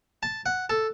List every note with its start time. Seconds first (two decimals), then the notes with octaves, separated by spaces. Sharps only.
0.23 A5
0.46 F#5
0.70 A4